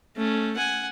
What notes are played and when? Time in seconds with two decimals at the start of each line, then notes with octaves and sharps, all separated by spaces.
0.17 A3 C#4
0.57 F#5 G#5